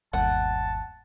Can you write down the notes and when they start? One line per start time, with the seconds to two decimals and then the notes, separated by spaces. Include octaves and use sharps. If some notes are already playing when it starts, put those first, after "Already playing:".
0.13 G1 D#2 F#5 A5